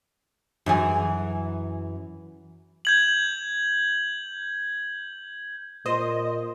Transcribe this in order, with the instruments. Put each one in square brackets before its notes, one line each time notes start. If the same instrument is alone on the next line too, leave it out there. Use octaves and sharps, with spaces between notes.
[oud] F#2 E3 G#4
[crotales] G6 G#6 F#7
[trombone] A#2 [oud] C5 [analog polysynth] D#5